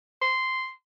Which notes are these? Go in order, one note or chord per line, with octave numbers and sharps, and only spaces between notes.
C6